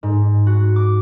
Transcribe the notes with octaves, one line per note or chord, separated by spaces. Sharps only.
G#2
F#4
D6